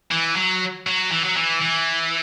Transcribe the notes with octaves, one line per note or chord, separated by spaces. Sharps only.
E3
F#3
F#3
E3
F#3
E3
E3